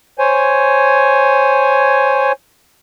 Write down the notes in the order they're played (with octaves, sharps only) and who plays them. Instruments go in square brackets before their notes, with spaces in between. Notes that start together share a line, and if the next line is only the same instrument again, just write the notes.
[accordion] C5 C#5 G#5